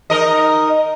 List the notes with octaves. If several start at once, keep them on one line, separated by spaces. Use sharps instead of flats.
D#4 A#4 D#5